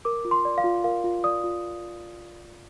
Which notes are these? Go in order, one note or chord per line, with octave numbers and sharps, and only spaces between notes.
A#4 D6
F4
C6
D5
F5
F4
A#4 F5
F4
D5 D#6
F4